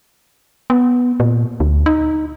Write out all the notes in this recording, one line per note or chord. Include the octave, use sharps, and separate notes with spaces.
B3
A#2
D2
D#4